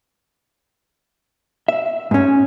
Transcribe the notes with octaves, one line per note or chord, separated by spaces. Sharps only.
E5
G#2 C#4